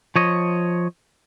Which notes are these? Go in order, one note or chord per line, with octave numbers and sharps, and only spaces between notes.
F3 C#5 D#5